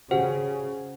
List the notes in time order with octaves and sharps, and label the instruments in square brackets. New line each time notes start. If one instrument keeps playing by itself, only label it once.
[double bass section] C#3 [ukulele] F#4 G4 [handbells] C5 [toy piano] F#5